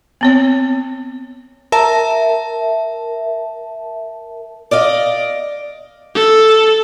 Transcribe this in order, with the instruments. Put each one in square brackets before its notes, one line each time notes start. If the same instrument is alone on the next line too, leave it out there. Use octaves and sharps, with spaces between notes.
[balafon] B3 C4 C#5
[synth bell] A#4 E5 A5
[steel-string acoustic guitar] D5 D#5 F5
[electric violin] A4